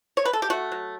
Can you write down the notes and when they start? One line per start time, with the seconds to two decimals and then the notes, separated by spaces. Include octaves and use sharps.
0.17 C#5
0.25 B4
0.33 A4
0.42 G4
0.50 A3 F#4
0.72 F#3